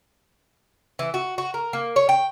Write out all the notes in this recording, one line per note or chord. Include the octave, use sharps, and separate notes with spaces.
E3
F#4
F#4
A#4
A#3
C#5
G5